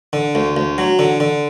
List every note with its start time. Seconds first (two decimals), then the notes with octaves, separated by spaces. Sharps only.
0.13 D3
0.35 D2
0.57 D2
0.78 F#3
0.99 D3
1.20 D3